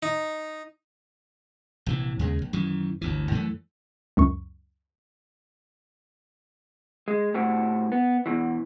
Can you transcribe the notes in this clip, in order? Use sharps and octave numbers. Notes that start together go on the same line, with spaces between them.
D#4
A#1 C3 E3
D#2 C#3 G#3
A#1
F#2 D#3 E3
G1 D2 E3
F#2 E3 A3
C#2 F#2 C#6
G#3
A2 G3 A3 C4 F#4
B3
E2 G2 B2 E3